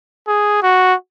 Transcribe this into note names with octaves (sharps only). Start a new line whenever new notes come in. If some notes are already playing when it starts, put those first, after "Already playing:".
G#4
F#4